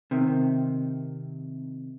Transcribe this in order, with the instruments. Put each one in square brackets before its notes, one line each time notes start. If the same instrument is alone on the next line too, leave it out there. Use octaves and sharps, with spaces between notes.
[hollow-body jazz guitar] C3 D#3